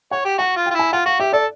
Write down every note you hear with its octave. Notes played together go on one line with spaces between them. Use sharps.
C#5 F#5
G4
F#4 F#5
F4
G5
F4
E4 G#5
F4 F#5
F#4 F5
G4 E5
A4 D5